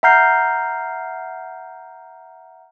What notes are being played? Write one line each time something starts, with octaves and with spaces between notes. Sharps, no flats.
E5 F#5 A#5 F6 G6 C7